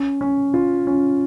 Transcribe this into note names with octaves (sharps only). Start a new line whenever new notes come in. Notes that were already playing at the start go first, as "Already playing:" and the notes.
Already playing: C#4
C#4
F4
C#4